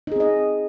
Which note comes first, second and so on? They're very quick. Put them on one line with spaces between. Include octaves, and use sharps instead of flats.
D#4 G#4 C4 D#5